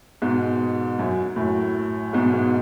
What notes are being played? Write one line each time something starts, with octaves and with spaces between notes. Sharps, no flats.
G#2 B2
F#2
F#2 A2
G#2 B2
G#2 B2